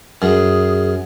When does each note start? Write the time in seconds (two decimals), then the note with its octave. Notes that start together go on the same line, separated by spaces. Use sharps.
0.22 F#2 G#4